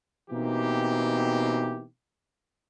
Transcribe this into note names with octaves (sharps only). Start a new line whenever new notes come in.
B2 E3 A#3 C4 D#4 G4